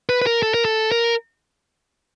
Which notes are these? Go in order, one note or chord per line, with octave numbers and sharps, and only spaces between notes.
B4
B4
A#4
A4
A#4
A4
A#4